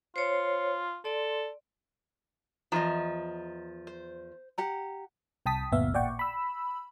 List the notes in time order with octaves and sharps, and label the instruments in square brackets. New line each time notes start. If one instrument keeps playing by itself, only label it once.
[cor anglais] F4 [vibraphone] C5 C#5
[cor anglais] A4 [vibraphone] D5 C6
[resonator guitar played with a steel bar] E2 F3 [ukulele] D#5 A#5
[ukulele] C5
G4 F#5 A#5
[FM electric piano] C2 G5 A5 D#6 B6
G1 D2 A#2 B3 E5 F5
A1 A#2 D5 F#5 G5 C#6
B5 E6